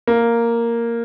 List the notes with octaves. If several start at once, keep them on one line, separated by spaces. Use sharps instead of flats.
A#3